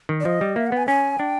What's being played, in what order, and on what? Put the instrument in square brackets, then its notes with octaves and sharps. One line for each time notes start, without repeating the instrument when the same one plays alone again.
[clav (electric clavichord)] D#3
[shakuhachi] D5
[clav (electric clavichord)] F3 [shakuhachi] D#5
[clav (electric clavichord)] G3
[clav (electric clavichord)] A#3 [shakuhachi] E5
[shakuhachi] F#5
[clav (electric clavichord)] B3 [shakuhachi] G#5
[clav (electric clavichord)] C#4 [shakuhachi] G#5
[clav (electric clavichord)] D4 [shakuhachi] G5